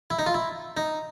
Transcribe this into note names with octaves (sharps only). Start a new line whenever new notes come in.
E4
D#4
F4
E4
D#4